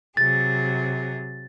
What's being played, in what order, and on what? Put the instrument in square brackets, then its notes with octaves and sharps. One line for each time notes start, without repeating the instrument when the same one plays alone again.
[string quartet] C3 F#3 G#4 [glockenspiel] A6